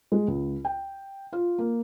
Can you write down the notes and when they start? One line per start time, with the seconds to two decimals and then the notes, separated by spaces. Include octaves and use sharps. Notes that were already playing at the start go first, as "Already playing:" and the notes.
0.12 G#3
0.28 C#2
0.65 G5
1.33 F4
1.58 A#3